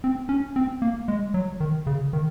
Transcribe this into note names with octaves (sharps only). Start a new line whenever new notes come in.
C4
C#4
C4
A#3
G#3
F#3
D#3
C#3
D#3